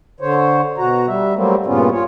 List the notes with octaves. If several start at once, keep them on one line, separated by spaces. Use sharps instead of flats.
D3 C5 C#5
B2 F#4 A#5
G3 E5
F#3 G3 A3 A#3 C4
G2 A#2 C#3 B3 C#4 F4
F4 C#5